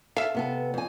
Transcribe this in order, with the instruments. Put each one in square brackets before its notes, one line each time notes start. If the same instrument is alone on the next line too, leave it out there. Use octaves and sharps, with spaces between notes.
[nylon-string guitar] A4 [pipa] E5 F5
[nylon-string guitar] C3 B3 A4
F2 G#5